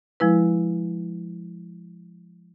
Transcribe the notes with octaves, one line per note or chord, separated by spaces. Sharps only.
F3 G#3 E4 B4